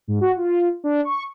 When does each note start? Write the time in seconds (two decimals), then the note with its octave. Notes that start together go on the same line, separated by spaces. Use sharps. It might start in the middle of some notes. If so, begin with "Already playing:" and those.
0.08 G#2
0.21 F#4
0.36 F4
0.84 D4
1.05 C#6